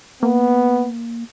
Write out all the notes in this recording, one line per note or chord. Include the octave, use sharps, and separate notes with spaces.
A#3 B3